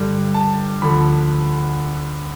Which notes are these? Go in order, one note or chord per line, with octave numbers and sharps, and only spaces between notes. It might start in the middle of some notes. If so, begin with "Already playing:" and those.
Already playing: G2 D3 G3
A5
D2 D3 F3 B5